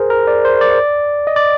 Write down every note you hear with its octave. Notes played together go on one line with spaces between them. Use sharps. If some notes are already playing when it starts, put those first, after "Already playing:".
Already playing: G#4 A#4 C5
A#4
D5
C5
D5
D#5
D5